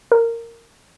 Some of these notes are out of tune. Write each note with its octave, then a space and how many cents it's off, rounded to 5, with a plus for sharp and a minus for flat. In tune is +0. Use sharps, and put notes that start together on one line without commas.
A#4 -15